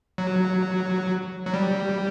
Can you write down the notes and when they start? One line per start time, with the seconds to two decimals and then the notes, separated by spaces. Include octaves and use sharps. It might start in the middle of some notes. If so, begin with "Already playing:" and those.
0.18 F#3
1.46 F#3
1.54 G3